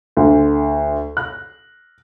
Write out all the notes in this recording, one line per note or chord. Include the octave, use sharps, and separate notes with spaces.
D2
F#6